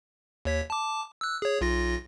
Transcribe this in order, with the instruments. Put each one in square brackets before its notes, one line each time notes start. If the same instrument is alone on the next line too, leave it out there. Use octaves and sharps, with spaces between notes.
[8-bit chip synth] D#2 C#5 B6
A5 D6
E6 F#6
G#4 C#5
B1 F4 A#6